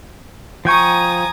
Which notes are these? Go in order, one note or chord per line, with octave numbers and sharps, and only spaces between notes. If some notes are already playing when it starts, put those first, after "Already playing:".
F3 G5 G#5 A#5 C#6 D#6